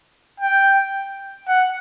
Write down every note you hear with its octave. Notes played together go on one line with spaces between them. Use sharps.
G5
F#5